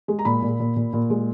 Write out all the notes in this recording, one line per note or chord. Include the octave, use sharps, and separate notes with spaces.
G#3
A#5
A#2 B5
A#2
A#2
A#2
A#2
G#3